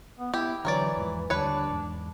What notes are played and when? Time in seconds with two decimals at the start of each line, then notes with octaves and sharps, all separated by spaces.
0.18 B3
0.34 B3 E4 G4
0.65 D3 E3 F#3 A#4 C#5 D5
0.97 E2 G#2 F3
1.30 D#2 D3 G3 D4 B4 C#5
1.71 E2 G#2